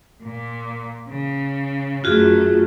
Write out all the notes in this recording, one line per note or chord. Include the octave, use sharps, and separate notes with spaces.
A#2
C#3
F#2 A3 F4 F#4 G#4